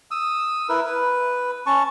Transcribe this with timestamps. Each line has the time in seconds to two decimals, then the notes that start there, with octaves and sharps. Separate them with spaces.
0.11 D#6 E6
0.69 E4 A#4 B4
0.86 B4
1.66 C#4 A5 C#6